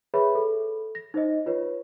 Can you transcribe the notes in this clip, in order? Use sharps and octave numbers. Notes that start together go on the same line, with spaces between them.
G#4 B4 C#5 E5 B5
A4
A#6
D#4 C5 D#5
F4 B4 C#5